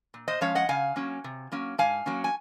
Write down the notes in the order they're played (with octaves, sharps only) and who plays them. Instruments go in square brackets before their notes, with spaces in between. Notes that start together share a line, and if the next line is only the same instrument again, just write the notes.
[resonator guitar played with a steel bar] A#2
C5 D#5
F3 G#3 C#4 C#5 F5
D#5 F#5
C#3 F5 G#5
F#3 A#3 C#4
C3
F#3 A#3 C#4
G#2 F5 G#5
F#3 A#3 C#4
G#5